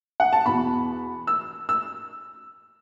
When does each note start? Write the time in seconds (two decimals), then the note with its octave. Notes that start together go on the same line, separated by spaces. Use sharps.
0.20 F#5
0.33 A5
0.46 E2 B2 B5
1.27 E6
1.69 E6